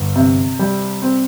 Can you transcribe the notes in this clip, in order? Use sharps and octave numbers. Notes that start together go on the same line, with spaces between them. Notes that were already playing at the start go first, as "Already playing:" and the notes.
Already playing: G1
C3
G3
C4